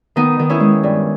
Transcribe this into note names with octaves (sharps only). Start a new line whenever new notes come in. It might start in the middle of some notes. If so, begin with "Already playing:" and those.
D#3 B3 D#4
D#3
C#4 E4
G#3
G2